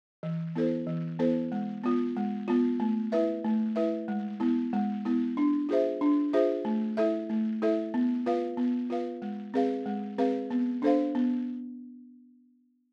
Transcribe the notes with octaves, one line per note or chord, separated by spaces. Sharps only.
E3
B3 E4 A4 C5
E3
B3 E4 A4 C5
G#3
B3 F4
G#3
B3 F4
A3
E4 B4 E5
A3
E4 B4 E5
G#3
B3 E4
G#3
B3 E4
D4
F4 G#4 C5 E5
D4
F4 G#4 C5 E5
A3
E4 A4 E5
A3
E4 A4 E5
B3
F4 B4 F5
B3
F4 B4 F5
G#3
C4 G#4 B4 F5
G#3
C4 G#4 B4 F5
B3
D4 A4 C5 F5
B3